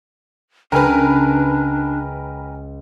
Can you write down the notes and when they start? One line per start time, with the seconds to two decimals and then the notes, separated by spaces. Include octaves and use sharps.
0.72 C#2 D4 A#4 B4 G5 G#5 F6